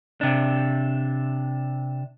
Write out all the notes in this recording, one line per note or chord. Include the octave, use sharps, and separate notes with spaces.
C3 D4